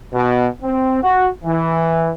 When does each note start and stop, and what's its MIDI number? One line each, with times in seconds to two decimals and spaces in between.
0.13 0.46 47
0.62 0.99 60
1.02 1.28 66
1.43 2.11 52